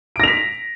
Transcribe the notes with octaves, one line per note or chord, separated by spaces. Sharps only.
A#6 B6 D7 F7